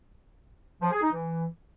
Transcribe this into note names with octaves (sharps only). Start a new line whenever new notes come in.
F3
G#4
D#4
E3